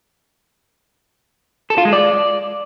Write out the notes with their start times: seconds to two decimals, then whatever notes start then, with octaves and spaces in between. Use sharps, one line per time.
1.70 A4
1.78 F4
1.85 G#3
1.93 D5